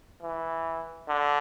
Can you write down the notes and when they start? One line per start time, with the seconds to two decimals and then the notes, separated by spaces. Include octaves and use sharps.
0.23 E3
1.08 D3